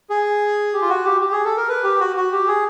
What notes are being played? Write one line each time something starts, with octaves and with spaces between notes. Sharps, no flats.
G#4
G4
F4
F#4
G4
G4
G#4
A4
A#4
B4
G4
F#4
F#4
G4
G#4